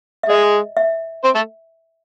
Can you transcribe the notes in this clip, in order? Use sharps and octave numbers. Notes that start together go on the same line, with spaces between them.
E5
G#3 G#4 D#5
E5
C4 C5
A3 A4